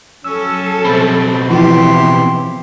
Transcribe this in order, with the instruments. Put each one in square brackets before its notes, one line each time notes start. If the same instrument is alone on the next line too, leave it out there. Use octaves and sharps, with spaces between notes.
[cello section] F#3 A4 [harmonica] C#4 [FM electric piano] E6
[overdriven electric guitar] B2 C4 [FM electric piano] B5 A6
[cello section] C#3 B3 E4 [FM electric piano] E3 F3 [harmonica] G4 C6